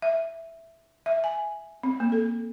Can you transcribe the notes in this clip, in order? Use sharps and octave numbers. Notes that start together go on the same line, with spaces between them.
E5
E5
G#5
C4
A#3
A4